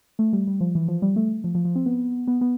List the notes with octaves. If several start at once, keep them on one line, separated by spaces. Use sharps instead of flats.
A3
G3
G3
F3
E3
F3
G3
A3
F3
F3
F3
C4
B3
B3
B3